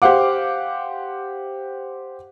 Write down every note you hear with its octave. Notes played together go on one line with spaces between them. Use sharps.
G4 C5 F5 F#5 D6